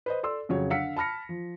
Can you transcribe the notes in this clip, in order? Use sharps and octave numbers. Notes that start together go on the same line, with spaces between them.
B4 C5 D#5
A4 D5 C6 E6
F2 C#3 F#3 C#5
D3 F5 F#5 E6 B6 C#7
A5 B5 F6 A#6 C#7
F3